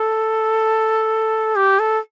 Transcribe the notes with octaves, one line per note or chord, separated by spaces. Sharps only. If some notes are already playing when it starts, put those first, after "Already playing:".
Already playing: A4
G4
A4